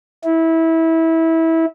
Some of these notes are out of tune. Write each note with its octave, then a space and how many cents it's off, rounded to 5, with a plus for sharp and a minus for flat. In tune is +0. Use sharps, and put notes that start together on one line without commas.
E4 -20